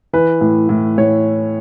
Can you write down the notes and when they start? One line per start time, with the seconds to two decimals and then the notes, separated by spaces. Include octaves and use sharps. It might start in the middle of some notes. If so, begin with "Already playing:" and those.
0.13 E3 B4
0.41 A2
0.69 A2
0.97 A2 C#5